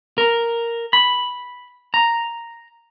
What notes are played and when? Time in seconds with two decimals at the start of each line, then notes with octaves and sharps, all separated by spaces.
0.18 A#4
0.93 B5
1.94 A#5